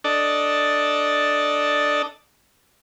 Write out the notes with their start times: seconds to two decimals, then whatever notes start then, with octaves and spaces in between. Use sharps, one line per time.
0.04 D4 A4 D5 D#5